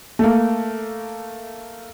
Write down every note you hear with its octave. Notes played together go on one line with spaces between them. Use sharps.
A3 A#3